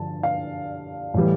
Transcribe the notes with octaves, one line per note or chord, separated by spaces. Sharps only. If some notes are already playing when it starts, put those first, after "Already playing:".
Already playing: G2 D3 F3 A5
F5
A2 E3 G3